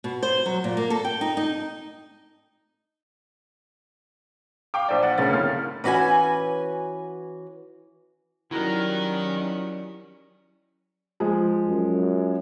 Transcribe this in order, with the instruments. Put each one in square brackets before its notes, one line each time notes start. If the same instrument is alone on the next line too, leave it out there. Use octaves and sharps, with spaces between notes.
[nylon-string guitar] B2
C5
F#3
A#2
A#3
A4
G5
D#4
D#4
[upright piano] F5 G5 D6
A#1 C5 D5
F#5 A6
F1 D2 C#3 C#4 A6
G1 A2 A#3 F6
[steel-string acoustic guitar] E3 C#4 F#4 B4 G#5
[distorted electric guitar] D#3 [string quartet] F#3 G3 C#4 [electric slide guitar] E4 F#4 A#4
[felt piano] F3 G#3
[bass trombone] F#2